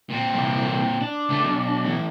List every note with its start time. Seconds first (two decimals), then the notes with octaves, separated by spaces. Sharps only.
0.10 A#2 C4
0.34 C3 E3 G3
1.01 D4
1.29 C#2 A3
1.43 B1
1.85 E3 A3